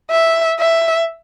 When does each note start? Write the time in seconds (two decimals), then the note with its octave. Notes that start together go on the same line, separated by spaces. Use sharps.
0.11 E5
0.59 E5